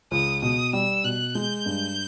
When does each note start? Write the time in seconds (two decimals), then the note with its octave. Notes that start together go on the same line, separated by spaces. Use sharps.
0.11 C#2 D#6
0.42 B2 D#6
0.73 G3 E6
1.04 B2 F#6
1.35 G#3 G6
1.66 G2